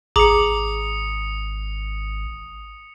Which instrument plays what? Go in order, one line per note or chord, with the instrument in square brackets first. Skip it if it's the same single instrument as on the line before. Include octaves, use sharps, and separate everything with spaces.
[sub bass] G#1 [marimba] G#4 [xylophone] A#5 D6 F#7 [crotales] D#6 C#7